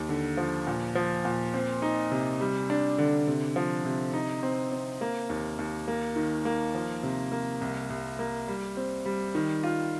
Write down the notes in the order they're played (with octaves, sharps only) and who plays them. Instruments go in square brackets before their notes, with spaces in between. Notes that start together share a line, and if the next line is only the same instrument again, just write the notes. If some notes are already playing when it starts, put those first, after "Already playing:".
Already playing: [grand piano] D#2
D3
F3
A#2
F3
A#2
C4
D#4
C3
G3
D4
D3
C3
F3
C3
D#4
C4
C4
A#3
D#2
D#2
A#3
D#3
A#3
F3
C3
A#3
C2
C2
A#3
G3
C4
G3
D#3
F4